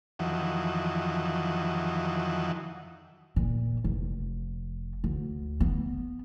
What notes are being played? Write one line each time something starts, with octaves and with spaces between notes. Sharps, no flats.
F2 D#3 E3 F#3
A#2
F1
D2
B3